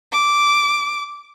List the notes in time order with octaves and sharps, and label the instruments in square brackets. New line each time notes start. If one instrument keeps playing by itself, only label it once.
[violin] D6